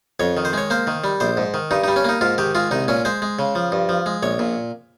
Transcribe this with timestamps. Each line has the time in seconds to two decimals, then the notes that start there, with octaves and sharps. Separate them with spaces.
0.20 F2 C#5
0.37 D#3
0.45 C5
0.53 G#3 C#5
0.70 A#3 C5
0.87 D#3
1.04 G3
1.20 A#1 C5
1.37 G#2
1.54 D#3
1.71 G2 D#4
1.84 D#4
1.88 G3
1.96 C#4
2.05 A#3 D#4
2.21 G#2 F4
2.38 D#3 G4
2.55 G#3 F4
2.71 C2 D#4
2.88 A#2 C#4
3.05 G#3 C5
3.22 G#3
3.39 C#3
3.55 F3
3.72 G2
3.89 F3
4.06 G#3
4.23 A#1 C#5
4.39 A#2